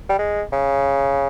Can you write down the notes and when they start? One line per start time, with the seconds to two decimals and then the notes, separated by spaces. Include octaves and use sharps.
0.09 G3
0.19 G#3
0.53 C#3